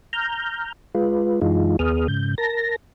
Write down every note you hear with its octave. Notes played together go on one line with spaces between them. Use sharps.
A#5 F6 G6
G#3 F4 B4
F#2 E3 G#3 D#4 F4
D#2 B3 G#4 D#6 F6
G#2 C#3 G6
A#4 A5 A#6